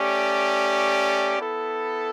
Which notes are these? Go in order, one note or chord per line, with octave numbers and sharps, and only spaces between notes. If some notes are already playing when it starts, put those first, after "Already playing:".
Already playing: A3 C#4 G4 D5
B3 E4 A4